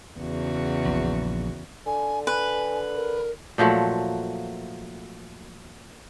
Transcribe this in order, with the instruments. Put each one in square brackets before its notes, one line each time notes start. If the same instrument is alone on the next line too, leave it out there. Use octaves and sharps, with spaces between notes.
[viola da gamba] E2 C#3 F#4
[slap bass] A#1
[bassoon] D3 [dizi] G#5
[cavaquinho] B4 [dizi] G#5
[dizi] A#4
[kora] A#2 F3 F#3 A3